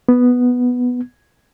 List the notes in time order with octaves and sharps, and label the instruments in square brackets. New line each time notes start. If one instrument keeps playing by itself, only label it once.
[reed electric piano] B3